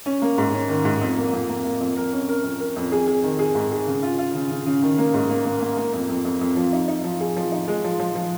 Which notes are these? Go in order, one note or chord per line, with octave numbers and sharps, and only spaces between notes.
C#4
A#3
G#2
C#4
D#3
G#2
F2
A#3
F2
A#3
A#3
F2
A#4
C#4
A#4
F2
A#4
F2
G#4
G#4
D#3
G#4
G#2
G#4
C#3
F4
F4
C#3
C#3
C#3
D#3
A#3
G#2
A#3
A#3
A#3
A#3
F2
F2
F2
F2
F3
D#4
D#4
F3
G#4
F3
D#4
G#3
F3
F3
F3